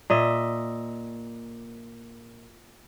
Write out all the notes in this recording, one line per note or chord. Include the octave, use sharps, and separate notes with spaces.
A#2 D#5 E5